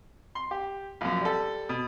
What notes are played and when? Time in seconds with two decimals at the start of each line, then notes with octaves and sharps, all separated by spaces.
0.35 C6
0.51 G4
1.01 A#1 F#2
1.21 G3 A4
1.69 B2